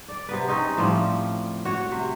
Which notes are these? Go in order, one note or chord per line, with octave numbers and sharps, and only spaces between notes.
D5
C3 B3 B4
C4 C#4 D#4
A2 F3 G3 F4
F#4 C#5
C3